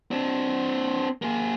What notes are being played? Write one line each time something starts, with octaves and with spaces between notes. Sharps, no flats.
C4 D4
A#3 G#4